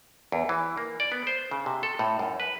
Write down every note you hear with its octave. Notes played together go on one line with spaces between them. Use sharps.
E2
E3
A#3
D5
B3
C5
C#3
C3
A4
A2
F#2
B4